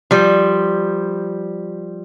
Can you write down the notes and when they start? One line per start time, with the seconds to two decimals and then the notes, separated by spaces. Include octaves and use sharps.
0.11 F3 G3